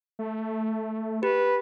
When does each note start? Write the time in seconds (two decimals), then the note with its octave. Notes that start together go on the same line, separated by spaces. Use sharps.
0.19 A3
1.23 G4 B4